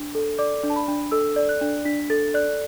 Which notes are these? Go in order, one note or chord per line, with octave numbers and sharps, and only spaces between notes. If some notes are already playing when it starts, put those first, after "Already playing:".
Already playing: D4
A4
D5 D6
D4
A5
B5
D4
A4 E6
D5
F#6
D4
D4 B6
A4 A6
D5 F#6